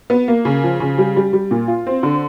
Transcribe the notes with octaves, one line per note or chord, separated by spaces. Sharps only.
B3
A#3
C#3
F3
C#3
G3
G3
G3
A#2
F4
C4
D3